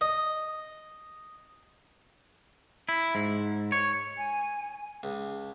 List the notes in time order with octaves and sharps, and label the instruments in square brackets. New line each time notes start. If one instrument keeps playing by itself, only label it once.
[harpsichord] D#5
[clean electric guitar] E4
G#2
C#5
[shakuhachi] G#5
[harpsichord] C#2